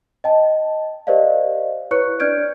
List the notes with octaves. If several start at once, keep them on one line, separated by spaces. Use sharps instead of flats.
D#5 G5 A5
G4 A#4 C5 D5 D#5 F5
E4 B4 C#5 C#6 F#6 C#7
D4 D5 F6 G6 G#6 D7